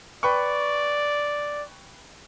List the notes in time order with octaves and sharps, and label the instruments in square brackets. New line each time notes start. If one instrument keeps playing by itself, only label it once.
[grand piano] B4 G5 C#6 [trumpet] D5